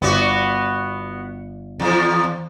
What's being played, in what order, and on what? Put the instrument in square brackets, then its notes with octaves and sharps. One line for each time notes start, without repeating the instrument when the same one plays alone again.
[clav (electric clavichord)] G1 D5 [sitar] B3 F#4
[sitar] E2 F3